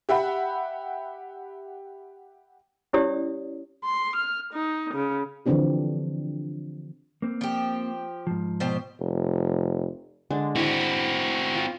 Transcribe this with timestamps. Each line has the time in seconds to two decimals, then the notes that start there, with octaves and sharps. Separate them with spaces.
0.09 G4 E5 F#5 B5
2.93 C#4 E4 G4 C#5 D5 D#6
3.83 C6
4.16 F6
4.52 D#4
4.93 C#3
5.46 D3 E3 F3 C4 D4 G4
7.22 A#3 C4
7.41 F3 G4
8.27 G#2 F3
8.60 B2 G4 C5
9.00 F1
10.30 D3 G#3 D4
10.56 C4 E4 F#4
10.81 B5
11.55 F4